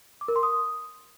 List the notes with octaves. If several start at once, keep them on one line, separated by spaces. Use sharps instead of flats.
D6
A#4
C6
D#6